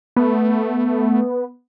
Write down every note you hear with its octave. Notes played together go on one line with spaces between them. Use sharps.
A3 B3